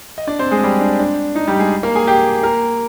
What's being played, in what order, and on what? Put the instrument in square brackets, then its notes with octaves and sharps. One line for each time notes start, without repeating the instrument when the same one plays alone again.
[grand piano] D#5
D4 D5
C4 C5
G#3 G#4
G3 G4
D4
D4
D#4
G3 G4
G#3 G#4
A#3 A#4
G#4 G#5
G4 G5
A#3 A#4